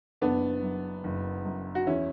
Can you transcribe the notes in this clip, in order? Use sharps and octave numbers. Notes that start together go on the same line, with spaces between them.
F#1 B3 D4
F#2
F#1
F#2
F#4
E2 C#4 E4